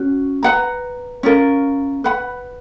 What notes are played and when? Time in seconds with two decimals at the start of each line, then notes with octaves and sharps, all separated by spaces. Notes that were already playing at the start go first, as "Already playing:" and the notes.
Already playing: C#4 F#4
0.43 B4 F#5 A#5
1.23 C#4 F4 A#4
2.04 B4 F#5 B5